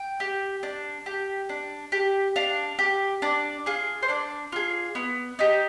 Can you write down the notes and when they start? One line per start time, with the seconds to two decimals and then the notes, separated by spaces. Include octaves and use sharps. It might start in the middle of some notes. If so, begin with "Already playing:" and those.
Already playing: G5
0.20 G4
0.63 D4
1.06 G4
1.49 D4
1.92 G4
2.36 D4 F5
2.79 G4
3.22 D4 D5
3.66 F4 G#4
4.03 C5
4.08 D4 D5
4.52 F4 G#4
4.95 B3
5.39 D#4 G4